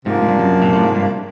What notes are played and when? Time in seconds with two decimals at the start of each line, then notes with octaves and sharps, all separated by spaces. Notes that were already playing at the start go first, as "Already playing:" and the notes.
0.06 G#2 C3 F3 A#3 D4
0.22 G#2
0.29 G2
0.39 F#2
0.62 A#2
0.73 A2
0.84 G#2
0.95 G2